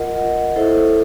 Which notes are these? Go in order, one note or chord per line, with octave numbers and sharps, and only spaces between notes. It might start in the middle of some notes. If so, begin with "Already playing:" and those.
Already playing: F4 A#4 D#5 F#5
F4 A#4 D#5 F#5
E4 A4 C5 E5